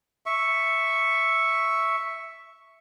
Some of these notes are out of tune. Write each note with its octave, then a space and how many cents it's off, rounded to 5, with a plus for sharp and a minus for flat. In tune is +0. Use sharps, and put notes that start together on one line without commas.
E5 +0 C#6 +0